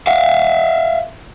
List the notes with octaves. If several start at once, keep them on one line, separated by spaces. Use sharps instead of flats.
E5 F5